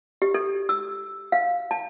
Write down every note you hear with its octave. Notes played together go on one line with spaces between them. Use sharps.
G4
A4
E6
F5
A5